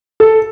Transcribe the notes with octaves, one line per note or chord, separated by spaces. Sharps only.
A4